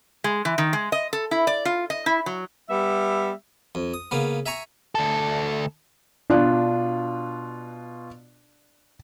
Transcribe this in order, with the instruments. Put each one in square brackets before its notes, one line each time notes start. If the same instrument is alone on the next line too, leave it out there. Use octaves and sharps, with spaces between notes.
[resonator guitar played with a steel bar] G#3
E3
D#3
G#3
D#5
A4
E4
D5
F4
D#5
E4
F#3
[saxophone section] G3 B3 E5
[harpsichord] F2
D#6
C#3 A#3 B3
E5 G#5 A#5 C#6
[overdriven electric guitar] D2 A4
[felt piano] B2 F4 F#6 [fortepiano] D4